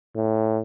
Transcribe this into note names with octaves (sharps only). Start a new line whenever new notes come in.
A2